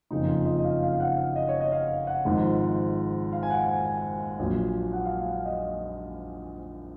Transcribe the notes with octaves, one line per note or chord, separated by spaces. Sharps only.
F#1 F2 C#3 F3 D#4
F4
D#5
D#5
F5
F5
F5
F#5
F5
D#5
C#5
D#5
F5
F#5
G#1 G#2 F3
F5
G#5
F#5
G#5
G#5
A#1 A#2 F#3
F#5
F5
F5
F#5
F5
D#5